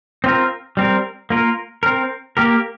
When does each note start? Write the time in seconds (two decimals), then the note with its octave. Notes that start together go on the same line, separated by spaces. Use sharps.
0.24 C4 F4 A#4
0.77 G3 C4 A#4
1.30 A#3 F4 A#4
1.83 C4 A#4
2.37 A#3 G4 A#4